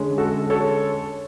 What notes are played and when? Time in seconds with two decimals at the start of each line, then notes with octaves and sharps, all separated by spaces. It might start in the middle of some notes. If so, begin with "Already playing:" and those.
Already playing: D3 G#3 C#4
0.18 F#4 A4
0.50 A4 C#5